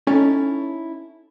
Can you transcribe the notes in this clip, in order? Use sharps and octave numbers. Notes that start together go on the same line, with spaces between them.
C#4 D#4 E4 A4 C#5